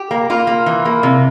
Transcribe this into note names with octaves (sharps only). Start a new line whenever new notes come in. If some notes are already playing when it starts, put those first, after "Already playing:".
Already playing: G4
A#3
A#3 F4
A#3
E3
A#3
C3